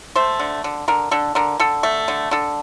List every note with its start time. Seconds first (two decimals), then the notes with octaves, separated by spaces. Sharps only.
0.16 A3 C5
0.40 D3
0.64 D3
0.88 D3 A#4
1.11 D3 A4
1.35 D3 A#4
1.60 D3 A4
1.83 A3
2.08 D3
2.31 D3 A4